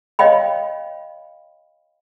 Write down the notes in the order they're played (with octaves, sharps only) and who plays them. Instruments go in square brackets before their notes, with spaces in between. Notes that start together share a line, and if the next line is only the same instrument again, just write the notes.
[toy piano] C#5 D#5 F5 G5 B5